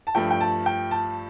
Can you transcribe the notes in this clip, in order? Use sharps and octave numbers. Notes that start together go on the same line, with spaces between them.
A5
G2 F3 A3 G5
G5
A5
G5
A5